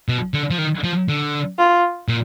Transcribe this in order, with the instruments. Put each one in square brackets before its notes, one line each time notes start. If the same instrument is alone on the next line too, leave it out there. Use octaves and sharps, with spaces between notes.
[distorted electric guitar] B2
D3
F3
D#3
F3
D3
[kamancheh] F4
[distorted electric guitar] A#2